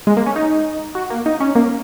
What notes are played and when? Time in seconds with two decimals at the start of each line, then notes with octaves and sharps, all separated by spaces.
0.07 G#3
0.17 A#3
0.26 C#4
0.36 D#4
0.95 F#4
1.10 A#3
1.26 D#4
1.40 C#4
1.55 A#3